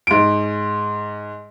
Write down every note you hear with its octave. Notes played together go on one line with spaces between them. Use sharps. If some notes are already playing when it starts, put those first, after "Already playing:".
G#2 D7